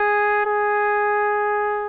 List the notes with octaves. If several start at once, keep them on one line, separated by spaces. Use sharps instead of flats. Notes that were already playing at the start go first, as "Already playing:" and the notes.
Already playing: G#4
G#4